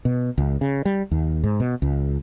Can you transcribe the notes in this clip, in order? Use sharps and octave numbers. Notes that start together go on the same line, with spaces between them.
B2
C#2
C#3
G3
D#2
G#2
B2
C#2